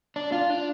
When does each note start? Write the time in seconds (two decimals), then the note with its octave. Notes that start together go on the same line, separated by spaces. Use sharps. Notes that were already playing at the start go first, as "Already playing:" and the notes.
0.16 D4
0.32 F4
0.50 D4